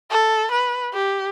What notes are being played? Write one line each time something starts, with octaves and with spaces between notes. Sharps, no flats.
A4
B4
G4